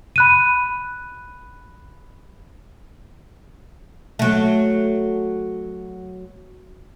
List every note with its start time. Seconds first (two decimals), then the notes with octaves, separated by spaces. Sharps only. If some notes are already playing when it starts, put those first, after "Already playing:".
0.16 B5 F#6 D#7
4.19 F#3 A3